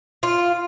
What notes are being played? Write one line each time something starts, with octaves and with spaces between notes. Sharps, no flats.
F4